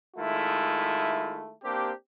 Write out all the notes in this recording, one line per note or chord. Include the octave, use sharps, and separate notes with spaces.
D#3 G#3 A3 E4 F4
A#3 C4 D4 G4